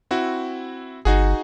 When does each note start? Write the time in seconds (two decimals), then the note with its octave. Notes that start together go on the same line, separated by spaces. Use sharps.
0.11 C4 E4 F#4
1.05 G1 D#4 F#4 G#4